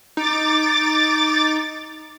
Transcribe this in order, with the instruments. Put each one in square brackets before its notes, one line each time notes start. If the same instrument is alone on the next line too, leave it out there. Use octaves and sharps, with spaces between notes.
[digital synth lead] D#4 [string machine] D6 A6